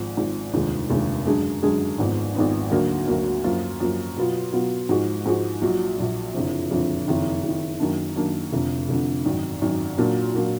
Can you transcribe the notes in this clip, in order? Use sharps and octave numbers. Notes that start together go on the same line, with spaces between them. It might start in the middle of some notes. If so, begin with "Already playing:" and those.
Already playing: G#1 G#2 F3
G#1 G#2 F3
F1 D#2 D3 F3 G#3
F1 D#2 D3 F3 G#3
F#2 D3 G#3 D4 G#4
F#2 D3 G#3 D4 G#4
G#1 G#2 F3 B3 D#4
G#1 G#2 F3 B3 D#4
D2 D3 F#3 A#3
D2 D3 F#3 A#3
F#2 F3 A#3 F4
F#2 F3 A#3 F4
B2 F#3 B3 F4
B2 F#3 B3 F4
G#2 F3 G#3 D#4 F#4
G#2 F3 G#3 D#4 F#4
A#1 A#2 F#3
A#1 A#2 F#3
F#1 F2 D3 F3
F#1 F2 D3 F3
F#1 F2 D#3
F#1 F2 D#3
F#2 D#3 A#3 D4
F#2 D#3 A#3 D4
F1 F2 D3
F1 F2 D3
G#1 F#2 D#3
G#1 F#2 D#3
A#2 F#3 A#3 D4 F4
A#2 F#3 A#3 D4 F4